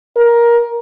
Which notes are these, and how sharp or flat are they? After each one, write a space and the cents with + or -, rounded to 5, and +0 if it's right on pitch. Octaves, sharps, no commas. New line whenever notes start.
A#4 +15